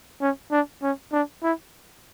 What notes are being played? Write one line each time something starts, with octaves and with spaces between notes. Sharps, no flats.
C#4
D4
C#4
D4
E4